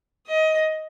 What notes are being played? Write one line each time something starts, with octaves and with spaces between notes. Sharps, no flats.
D#5